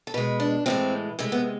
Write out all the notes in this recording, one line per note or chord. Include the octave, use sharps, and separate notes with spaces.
A4
B2 G#3 B4
D4
A2 E3 G#3 C4
C3 G#3 A3
B3